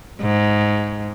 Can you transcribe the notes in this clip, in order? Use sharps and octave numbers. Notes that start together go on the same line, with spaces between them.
G#2